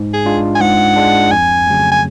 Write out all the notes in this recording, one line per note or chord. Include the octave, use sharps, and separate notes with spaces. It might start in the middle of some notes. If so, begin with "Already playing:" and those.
Already playing: G#2
G#4
G#3 D4 F4
G#5
G#2 F#5
G#3 D4 F4
F2 G#5
C#3 F#3 A3
G#5